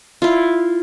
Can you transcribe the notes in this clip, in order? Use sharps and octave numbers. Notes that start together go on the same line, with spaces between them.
E4 F4